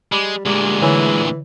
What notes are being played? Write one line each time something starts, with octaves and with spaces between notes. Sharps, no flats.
G3 G#3 B5 D6
D2 A#2 G3 G#3
D3 E3 C#5 G#5